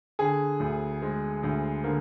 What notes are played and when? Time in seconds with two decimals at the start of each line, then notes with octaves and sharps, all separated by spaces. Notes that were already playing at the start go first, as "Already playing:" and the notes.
0.19 D3 G#4
0.60 D2
1.02 G#3
1.43 D2
1.84 D3 A#3